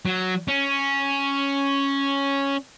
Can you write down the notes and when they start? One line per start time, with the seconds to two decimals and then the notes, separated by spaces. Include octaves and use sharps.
0.06 F#3
0.48 C#4